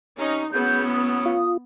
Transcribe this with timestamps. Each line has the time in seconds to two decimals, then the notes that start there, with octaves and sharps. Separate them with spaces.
0.18 C3 C#4 D#4
0.53 A2 F#3 B3 C#4 G#4 G6
0.91 D#6
1.26 F4